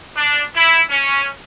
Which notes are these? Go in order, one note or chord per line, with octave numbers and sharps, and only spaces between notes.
D4
E4
C#4